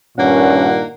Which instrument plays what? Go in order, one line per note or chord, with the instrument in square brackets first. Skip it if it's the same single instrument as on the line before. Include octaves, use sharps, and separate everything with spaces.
[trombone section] G2 A#2 D#3 [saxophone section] A#3 F#5 [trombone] C#4